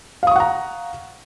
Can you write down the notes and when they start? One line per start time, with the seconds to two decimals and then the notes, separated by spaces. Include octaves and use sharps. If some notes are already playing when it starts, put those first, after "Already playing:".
0.23 F5
0.27 D#6
0.31 C#6
0.36 F#5
0.40 A#5